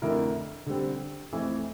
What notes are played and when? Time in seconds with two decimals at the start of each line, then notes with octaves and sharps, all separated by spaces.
0.02 F2 D3 A3 E4 A#4
0.66 D3 G3 C4
1.33 F2 E3 A3 C4